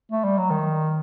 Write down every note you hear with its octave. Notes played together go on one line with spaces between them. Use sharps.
A3
G3
F#3
D#3